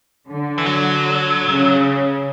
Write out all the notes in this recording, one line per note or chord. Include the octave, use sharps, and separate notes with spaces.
D3
E3
F#3
C#3